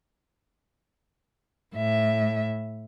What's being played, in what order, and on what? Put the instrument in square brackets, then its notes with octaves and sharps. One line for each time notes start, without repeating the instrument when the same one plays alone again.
[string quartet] A2 E5